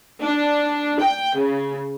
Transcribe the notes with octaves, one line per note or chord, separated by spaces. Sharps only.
D4
G5
C#3